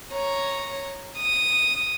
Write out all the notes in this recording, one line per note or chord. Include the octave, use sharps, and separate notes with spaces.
C#5 A#5
D#6